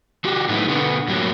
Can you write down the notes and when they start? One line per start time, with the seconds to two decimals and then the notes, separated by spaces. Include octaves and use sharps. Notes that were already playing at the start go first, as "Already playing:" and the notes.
0.24 D#3 F#4 G4
0.49 A2 F#3 A3 B3 D#4 E4
0.68 B2 D3 B3
1.08 F#2 A2 G3 A#3 F#4 C#5